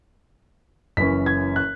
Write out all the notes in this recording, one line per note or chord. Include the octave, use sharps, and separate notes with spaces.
F#1 F#2 E3 C#4 B6
G#6
F#6